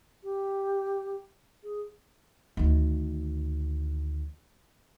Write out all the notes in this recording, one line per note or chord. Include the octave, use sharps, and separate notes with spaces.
G4
G#4
D2 D#3